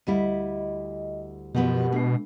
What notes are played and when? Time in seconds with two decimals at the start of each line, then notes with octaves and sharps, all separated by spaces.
0.07 D2 G3 E4 D#5
1.55 F#2 B2 F3 B3 G4 A#4 F#5
1.92 G#3 A3 D4